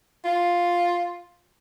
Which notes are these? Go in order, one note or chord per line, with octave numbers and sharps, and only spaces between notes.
F4